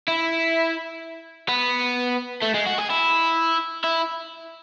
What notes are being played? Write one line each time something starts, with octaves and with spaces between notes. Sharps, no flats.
E4
B3
A3
G#3
F#4
G#4
E4
E4